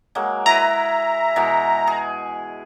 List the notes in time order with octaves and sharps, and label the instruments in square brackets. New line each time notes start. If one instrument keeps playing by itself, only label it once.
[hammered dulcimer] F#3 G#3 A#3
[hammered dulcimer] E4 B4 [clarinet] E5 [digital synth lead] A#5
[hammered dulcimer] B2 E3 G#3
G#4